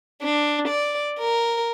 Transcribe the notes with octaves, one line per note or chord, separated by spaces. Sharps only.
D4
D5
A#4